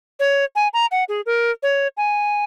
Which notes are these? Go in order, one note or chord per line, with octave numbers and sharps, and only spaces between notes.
C#5
G#5
A#5
F#5
G#4
A#4
C#5
G#5